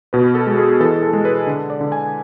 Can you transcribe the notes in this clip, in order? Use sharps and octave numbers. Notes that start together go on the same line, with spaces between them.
B2 B4
A4
G#3
G#4
E3 A4
A4
G#3
B4
D3
D5
D3
G#5